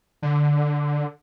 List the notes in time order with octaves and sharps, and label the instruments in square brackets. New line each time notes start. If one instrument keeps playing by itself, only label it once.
[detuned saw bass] D3